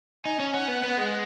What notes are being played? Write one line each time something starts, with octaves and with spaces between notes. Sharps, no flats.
D#4 G#5
C#4
C#4 F#5
B3
B3
G#3